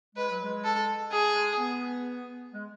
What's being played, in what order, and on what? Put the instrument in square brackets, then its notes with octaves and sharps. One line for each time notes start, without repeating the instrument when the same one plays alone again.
[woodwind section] G#3 [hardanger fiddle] B4
[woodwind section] F#3
G#3
[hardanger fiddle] A4
G#4
[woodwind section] G#3
B3
G#3